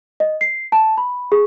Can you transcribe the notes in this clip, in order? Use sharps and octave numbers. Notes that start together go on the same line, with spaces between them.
D#5
C7
A5
B5
G#4